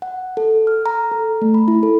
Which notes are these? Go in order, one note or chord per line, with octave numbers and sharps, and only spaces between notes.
F#5
A4
F6
A#5
A4
A3
B5
E4
A4